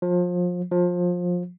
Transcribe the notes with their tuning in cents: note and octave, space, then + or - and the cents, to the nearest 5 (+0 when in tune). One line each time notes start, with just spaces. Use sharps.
F3 +30
F3 +25